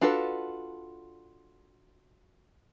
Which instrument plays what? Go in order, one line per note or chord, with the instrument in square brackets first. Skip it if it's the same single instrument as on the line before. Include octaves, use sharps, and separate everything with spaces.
[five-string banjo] D4 F4 F#4 A4 B4